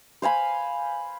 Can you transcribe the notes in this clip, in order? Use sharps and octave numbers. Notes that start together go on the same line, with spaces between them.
C5 F5 G#5 B5